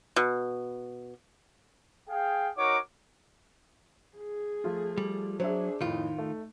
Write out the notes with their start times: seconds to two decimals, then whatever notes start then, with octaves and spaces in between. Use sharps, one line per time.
0.16 B2
2.09 G#4 F5 G5
2.56 D#4 F#4 A#4 C#5 F#5 D6
4.18 G#4
4.64 F3 A3 F4
4.98 G3
5.40 F#3 D4 G#4 C5 E5
5.81 F2 A2 D#3 D#4 F4
6.18 A3